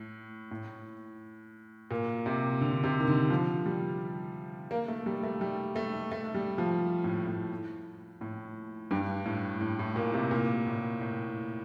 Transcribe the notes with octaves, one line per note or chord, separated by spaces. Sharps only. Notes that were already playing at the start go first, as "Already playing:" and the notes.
Already playing: A2
A2
A#2
C3
D3
C3
D#3
D3
F3
G3
A#3
A3
G3
A3
G3
A3
A3
G3
F3
A2
A2
A2
G2
A2
A2
A2
A#2
C3
A#2
A2
A2